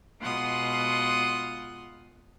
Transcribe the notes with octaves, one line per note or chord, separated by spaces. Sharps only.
B2 G#3 F4 F#5 C6 D#6